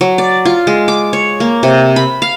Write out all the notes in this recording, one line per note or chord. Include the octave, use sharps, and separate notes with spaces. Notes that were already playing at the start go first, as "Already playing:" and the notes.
F#3
D5
F4
G#3
D6
C#5
A#3
C3
B5
F5